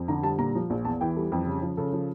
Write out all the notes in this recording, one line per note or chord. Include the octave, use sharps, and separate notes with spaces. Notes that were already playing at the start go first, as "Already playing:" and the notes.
Already playing: F2
D3 A#5
G3 A5
A#2 A#5
F3
A#1
E2 A5
E3 G5
G3 A4
F2 G4
C#3
F3
C#3 A4
F3